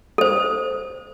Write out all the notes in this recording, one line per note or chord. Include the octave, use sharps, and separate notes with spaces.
A4 C5